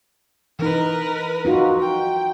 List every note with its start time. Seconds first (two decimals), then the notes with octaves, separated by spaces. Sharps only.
0.59 E3 D#4 A#4 B4
1.45 D#4 F4 F#4
1.79 G5